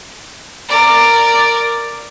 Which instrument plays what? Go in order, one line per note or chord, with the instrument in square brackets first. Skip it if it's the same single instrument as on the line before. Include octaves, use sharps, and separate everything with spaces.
[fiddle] A#4 D5